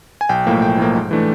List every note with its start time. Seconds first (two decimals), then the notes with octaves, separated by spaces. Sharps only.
0.21 G#5
0.29 B1 G5
0.46 A2 F3 A#3
0.62 B1 G5
0.78 A2 F3 A#3
0.95 G#2
1.11 E3 A3 D4